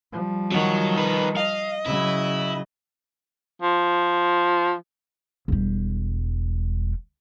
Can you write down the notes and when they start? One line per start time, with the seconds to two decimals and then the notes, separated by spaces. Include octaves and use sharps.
0.13 F3 G3
0.52 D#3 F#3 F#4
0.97 D#4 B4
1.37 D#5 F5
1.86 C#3 F#3 E4
3.62 F3
5.48 E1 G3